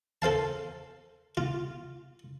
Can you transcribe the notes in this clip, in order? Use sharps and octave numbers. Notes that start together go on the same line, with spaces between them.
A4 C5 F5 A5
F4